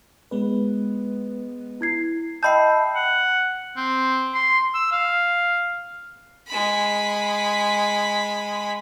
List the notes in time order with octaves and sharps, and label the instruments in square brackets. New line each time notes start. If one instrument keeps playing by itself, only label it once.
[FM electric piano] G#3 B3 B4
[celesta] E4 G#6 C7
[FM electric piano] D#5 E6 [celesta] E5 G5 G6 [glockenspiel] A5 B5 C7
[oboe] F#5
C4
C6
E6
F5
[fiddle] G#3 B5